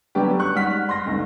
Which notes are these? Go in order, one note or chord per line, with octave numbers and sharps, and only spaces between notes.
D3 F#3 G3 B3 C#4 G4
C#6 F#6
G#2 G3 F#5 F6 B6
C6 A#6
G1 D2 G#2